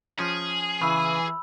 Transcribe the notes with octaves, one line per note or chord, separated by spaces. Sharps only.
F3 C#4 G#4
C#3 E3 B5 E6